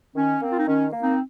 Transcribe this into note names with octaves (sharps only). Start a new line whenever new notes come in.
D#3 C#4
A#3 C4
F4
D#4
D#3 C#4
A#3
C4 D#4